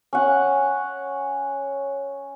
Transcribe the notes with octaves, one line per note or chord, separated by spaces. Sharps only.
C#4 F#5